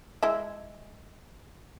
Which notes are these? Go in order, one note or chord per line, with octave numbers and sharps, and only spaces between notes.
G#3 E4 E5